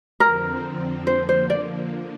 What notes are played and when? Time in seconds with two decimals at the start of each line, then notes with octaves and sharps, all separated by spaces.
0.20 F2 D3 F3 C4 A#4
1.07 D3 F3 A#3 C5
1.29 C5
1.50 D5